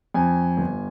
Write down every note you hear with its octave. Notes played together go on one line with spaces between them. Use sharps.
F2 G#5
G1